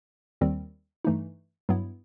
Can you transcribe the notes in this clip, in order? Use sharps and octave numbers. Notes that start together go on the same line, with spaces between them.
D#2 D#3 G3 C4
G2 E3 A3 D#4
G2 F#3 B3 E4